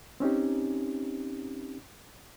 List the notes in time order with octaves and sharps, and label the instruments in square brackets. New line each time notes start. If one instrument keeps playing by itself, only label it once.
[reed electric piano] C4 C#4 D#4 G4